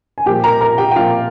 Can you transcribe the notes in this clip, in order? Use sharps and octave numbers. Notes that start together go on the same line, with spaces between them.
G#5
A#2 F3 G4 G5
A#4 A#5
A#4 A#5
G4 G5
G5
A#2 F3 F4 F5